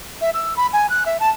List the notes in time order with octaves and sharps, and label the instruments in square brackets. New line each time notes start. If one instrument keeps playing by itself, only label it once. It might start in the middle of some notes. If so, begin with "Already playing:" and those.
[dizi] E5
E6
B5
G#5
F#6
E5
A5